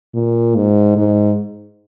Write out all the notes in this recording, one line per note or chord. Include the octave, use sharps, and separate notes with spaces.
A#2
G#2
G#2